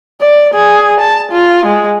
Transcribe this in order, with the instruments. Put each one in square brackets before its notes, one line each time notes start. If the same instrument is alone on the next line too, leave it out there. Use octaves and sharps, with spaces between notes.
[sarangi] D5
G#4
A5
F4
G#3